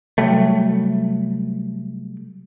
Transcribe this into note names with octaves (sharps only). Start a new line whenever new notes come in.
C3 F#3 G3 A3